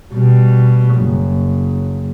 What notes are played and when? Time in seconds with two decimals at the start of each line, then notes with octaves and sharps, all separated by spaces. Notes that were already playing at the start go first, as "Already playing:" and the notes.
0.14 B2 G3
0.97 F#1